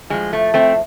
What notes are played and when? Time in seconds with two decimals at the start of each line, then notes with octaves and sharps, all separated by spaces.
0.10 A2 F3 G#3
0.33 A3
0.54 A3 C4